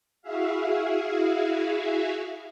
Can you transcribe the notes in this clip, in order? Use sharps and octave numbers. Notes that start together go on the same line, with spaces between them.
E4 F#4 G#4 E5 F5